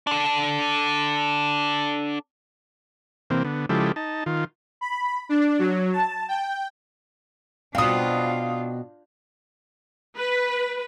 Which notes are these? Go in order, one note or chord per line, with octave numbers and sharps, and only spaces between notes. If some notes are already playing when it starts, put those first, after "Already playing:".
D4 A4
C3 E3 A#3 C4
D3 B3
C#3 F3 G#3 E4 G4 A4
D#4 A5
D#3 F4
B5
D4
F#3
A5
G5
B2 C4 D4 F4 F5 D#6
B4